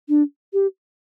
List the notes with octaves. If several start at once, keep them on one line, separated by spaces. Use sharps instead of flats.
D4
G4